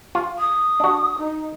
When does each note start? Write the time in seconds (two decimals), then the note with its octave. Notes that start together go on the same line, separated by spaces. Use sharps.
0.15 F4
0.38 D#6
0.80 D4 F#4
1.18 D#4